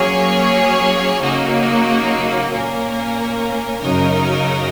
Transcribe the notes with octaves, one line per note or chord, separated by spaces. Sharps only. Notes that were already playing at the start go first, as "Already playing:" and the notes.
Already playing: F#3 A#3 C#4 G#4 C#5
C#3 F#3 A#3 D#4 F#4
A#2 A#3 C#4 A#4
F#2 C#3 F#3 D#4 A#4